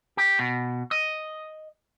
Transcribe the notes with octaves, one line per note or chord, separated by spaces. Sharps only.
G4
B2
D#5